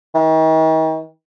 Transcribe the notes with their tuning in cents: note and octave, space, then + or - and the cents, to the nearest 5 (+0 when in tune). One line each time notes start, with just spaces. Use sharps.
D#3 +40